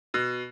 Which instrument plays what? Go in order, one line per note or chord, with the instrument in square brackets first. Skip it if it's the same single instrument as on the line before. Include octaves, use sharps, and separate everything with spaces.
[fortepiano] B2